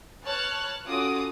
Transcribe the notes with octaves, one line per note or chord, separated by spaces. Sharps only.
B4 C#5 A5 C#6 F6 F#6
C#4 F4 F#4 A4 D6 D#6